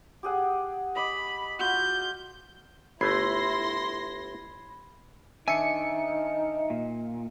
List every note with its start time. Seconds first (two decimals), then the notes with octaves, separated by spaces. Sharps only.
0.23 G4 G#4 F#5
0.96 D#5 B5 D6
1.59 F4 F#4 G6
3.01 G1 A3 E4 B5 C6 G#6 A#6 C7
5.48 D#3 D4 D#4 E5 G#5 C#7
6.70 A#2